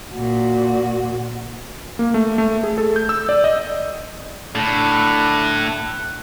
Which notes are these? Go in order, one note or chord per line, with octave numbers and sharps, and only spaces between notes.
A#2 F#4
A#3
A3
A3
G#4
A4
G6
E6
D5
D#5
A2 D3 F#6